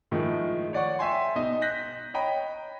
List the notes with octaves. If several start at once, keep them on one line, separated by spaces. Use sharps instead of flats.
A2 D#3 F3 G#3
C#5 D5 F#5 C#6
E5 G5 G#5 C6
B2 D#4 D#5
F#6 G6 A#6 B6
C#5 D#5 G5 A#5 B5